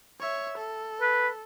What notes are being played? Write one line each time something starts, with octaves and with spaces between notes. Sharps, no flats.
C#5 E5
A4
B4